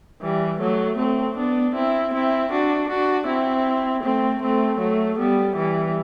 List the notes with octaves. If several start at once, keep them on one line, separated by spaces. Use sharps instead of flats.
E3 G3
F#3 A3
A3 C4
B3 D4
C4 E4
C4 E4
D4 F#4
D4 F#4
C4 E4
A3 C4
A3 C4
F#3 A3
G3 B3
E3 G3